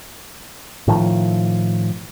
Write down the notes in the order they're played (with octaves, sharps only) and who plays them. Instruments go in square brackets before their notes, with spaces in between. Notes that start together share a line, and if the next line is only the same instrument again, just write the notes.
[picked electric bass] A2 D#3 F3